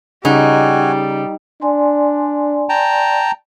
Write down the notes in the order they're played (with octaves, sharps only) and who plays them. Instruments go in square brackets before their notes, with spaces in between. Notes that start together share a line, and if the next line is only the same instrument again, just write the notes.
[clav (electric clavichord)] C#3 [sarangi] G3 [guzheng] D#4 [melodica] F#4 G#5
[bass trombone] D4 [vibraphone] D5 G#5 C6
[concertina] G5 A5 A#5